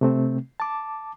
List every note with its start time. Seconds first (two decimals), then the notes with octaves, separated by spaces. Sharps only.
0.01 C3 A3 C4
0.60 A5 D6